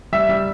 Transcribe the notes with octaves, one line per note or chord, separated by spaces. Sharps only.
G3 E5
G3